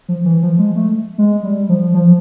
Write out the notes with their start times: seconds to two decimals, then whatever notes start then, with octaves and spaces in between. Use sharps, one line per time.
0.08 F3
0.25 E3
0.42 F3
0.59 G#3
0.76 A3
1.18 G#3
1.43 G3
1.69 F3
1.94 F3